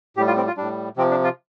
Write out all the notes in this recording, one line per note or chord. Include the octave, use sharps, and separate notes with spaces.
A2 G3 G4
F4
C4
F4
A2 G3 D4
C3 F3 C4
D4
F4